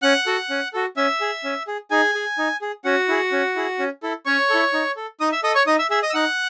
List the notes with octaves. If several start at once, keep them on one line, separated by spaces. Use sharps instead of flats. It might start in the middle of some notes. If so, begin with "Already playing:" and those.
C#4 F#5 F#6
F#4 A4
C#4
F#4 A4
C#4 E5 E6
G#4
C#4
G#4
D#4 G#4 G#5
G#4
D#4
G#4
C#4 F#4 F#5
E4 G#4
C#4
E4 G#4
C#4
E4 A4
C#4 C#5 C#6
E4 A4
D#4
A4
D#4 D#5 D#6
E5 E6
A4 D#5 D#6
C#5 C#6
D#4 D#5 D#6
E5 E6
G#4 E5 E6
D#5 D#6
E6
D#4 F#5 F#6